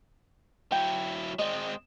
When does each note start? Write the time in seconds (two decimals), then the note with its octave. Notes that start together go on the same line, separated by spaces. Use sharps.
0.72 F#3 E4 G5
1.39 G#3 C4 D5 D#5